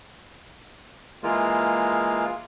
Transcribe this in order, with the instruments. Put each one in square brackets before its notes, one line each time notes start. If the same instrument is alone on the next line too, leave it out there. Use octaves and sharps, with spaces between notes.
[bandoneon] E3 G#3 A#3 F4